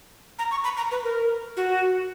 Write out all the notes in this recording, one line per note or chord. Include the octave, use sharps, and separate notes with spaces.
A#5
C#6
B5
A#5
B4
A#4
F#4